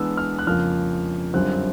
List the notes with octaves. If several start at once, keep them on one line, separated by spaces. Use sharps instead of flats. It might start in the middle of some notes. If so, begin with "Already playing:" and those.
Already playing: E3 G#3 B3 D4 E6
F6
F#6
F2 C#3 F3 A#3 F6
F#2 D3 G3 C4 F4 F#6